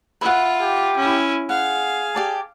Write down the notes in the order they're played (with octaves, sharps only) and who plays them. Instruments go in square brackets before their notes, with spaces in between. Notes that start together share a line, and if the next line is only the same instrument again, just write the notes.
[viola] F4 [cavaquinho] B4 E5 F#5
[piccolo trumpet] G4
[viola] C#4 E4
[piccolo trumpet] G#4 [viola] F5 [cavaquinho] F#5
[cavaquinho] G4 D5 A5